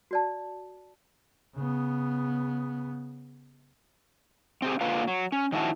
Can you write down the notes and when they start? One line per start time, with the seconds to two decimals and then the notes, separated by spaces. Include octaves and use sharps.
0.11 F#4 D5 A5
1.56 C#3 B3
4.62 C4 G4 G#4
4.81 D3 A#3 D4 F4 B4 F5
5.08 F#3
5.32 C#4
5.52 D#3 F3 C#4 E4 F#4 A5